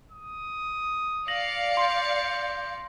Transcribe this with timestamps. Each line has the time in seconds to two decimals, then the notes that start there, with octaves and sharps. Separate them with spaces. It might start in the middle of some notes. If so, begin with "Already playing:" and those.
0.11 D#6
1.28 D5 F5 A#6 C#7 F#7
1.77 C6 G6